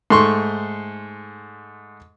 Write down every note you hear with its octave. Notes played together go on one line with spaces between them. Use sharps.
G#2 A3 C6 C#6